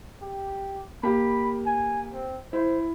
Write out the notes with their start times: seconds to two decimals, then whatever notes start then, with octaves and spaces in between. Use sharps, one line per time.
0.22 G4
1.03 A#3 G4 B5
1.66 G#5
2.13 C4
2.53 E4 C5